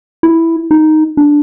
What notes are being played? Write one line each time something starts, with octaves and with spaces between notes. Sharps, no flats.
E4
D#4
D4